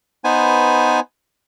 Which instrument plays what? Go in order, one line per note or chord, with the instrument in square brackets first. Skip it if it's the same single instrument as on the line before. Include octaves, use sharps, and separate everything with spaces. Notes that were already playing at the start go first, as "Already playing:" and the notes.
[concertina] B3 D#4 B4 C5 G#5